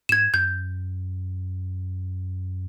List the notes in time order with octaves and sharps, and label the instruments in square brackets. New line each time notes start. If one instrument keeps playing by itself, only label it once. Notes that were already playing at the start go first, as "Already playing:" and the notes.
[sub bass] G#2 [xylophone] G#6 E7
[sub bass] F#2 [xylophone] G6